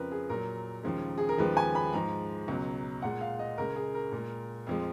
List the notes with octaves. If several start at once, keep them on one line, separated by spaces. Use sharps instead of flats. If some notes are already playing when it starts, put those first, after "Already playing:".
Already playing: F2 C#3 F3 A#4 B4
G#4
A#2 F#3 A#4
D#2 C#3 F3 G#3
G#4
A#4
D#2 C#3 F3 G#3 B4
G#5
B5
G#2 F3 G#3 A#5
C#2 B2 F#3
A#2 G#3 F#5
F5
D#5
C#2 C#3 G#3 A#4
G#4
A#4
A#2 G#3
F2 F3 G#3